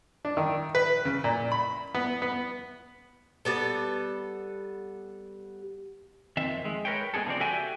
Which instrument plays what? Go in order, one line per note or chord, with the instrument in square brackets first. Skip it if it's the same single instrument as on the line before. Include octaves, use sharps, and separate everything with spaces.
[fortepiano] D4
D#3
B4
C#3
A#2
B5
B3
B3
[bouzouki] G3 B3 A4
[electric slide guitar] F2 D#3 C4 E5
G#3
A#4 B4 C#5 G5
G#3 B3 D#4 G#4 A4
C#3 F3 C4 D5
F#4 G4 A4 E5 G5 G#5